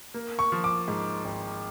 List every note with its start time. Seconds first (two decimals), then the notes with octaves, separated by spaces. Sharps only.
0.14 A#3
0.39 C#6
0.52 F3
0.64 D6
0.88 G#2
1.25 G#1